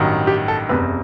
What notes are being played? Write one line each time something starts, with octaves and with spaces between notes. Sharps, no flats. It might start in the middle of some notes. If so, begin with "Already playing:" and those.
Already playing: A1 G2 D#3 F#3
G4
A4
F#1 E2 C3 B4